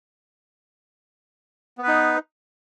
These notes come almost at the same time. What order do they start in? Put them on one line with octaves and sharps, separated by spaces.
B3 B4 D#4